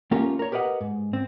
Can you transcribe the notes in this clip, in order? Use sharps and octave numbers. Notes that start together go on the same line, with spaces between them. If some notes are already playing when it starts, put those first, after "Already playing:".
A3 A#3 C#4 F4 G4 A#4
A#4 C#5
G4 A#4 B4 D#5 F#5
G#2
C4